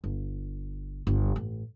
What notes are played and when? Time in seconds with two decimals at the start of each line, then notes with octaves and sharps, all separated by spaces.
0.04 G1
1.07 G1
1.36 A1